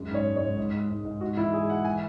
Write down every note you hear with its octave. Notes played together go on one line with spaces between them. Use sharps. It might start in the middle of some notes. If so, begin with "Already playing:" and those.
Already playing: F#2 G#3
G#2 C#5
G#3
C#5
G#2
G#2
G#3
G#2
G#2
G#2 F#4
E3 E4
G#3 G#4
G#3 F#5
E3 G#5